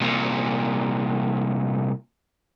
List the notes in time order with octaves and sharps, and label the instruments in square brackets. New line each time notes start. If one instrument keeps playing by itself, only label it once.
[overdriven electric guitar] C2 A#2